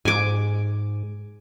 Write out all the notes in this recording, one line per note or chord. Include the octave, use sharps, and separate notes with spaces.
G#2 G#5 D6